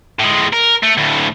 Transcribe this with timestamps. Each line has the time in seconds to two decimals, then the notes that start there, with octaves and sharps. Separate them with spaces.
0.19 A2 G#3
0.53 A#4
0.83 A3
0.97 D2 A2